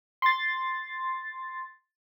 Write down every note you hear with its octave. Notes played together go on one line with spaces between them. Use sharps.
C6 A6